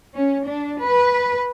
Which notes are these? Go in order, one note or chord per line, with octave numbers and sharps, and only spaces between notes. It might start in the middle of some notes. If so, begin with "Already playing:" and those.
C#4
D4
B4